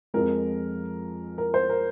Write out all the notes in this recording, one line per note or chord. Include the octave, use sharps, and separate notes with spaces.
F2 F3 G#3 A#4
A#4
C5
A#4